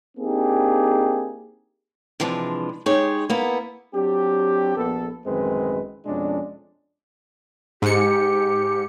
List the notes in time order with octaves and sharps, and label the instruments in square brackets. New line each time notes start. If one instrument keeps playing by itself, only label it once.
[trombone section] A#3 C4 D4 D#4 G4 G#4
[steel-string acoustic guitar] C3 E3 F3 G#3 D4
G#3 D#4 G4 G#4 C#5
A#3 B3 E4
[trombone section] F#3 C4 D4 G4
A#1 B3 A4
A1 F#2 D#3 G#3 C4 B4
F2 B2 G#3 C#4 D4
[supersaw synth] G#2 C#7 [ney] G4